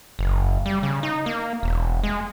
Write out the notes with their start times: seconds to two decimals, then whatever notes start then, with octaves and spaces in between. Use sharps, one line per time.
0.19 F#1
0.66 G3
0.83 C#3
1.03 D#4
1.26 A#3
1.63 E1
2.03 G#3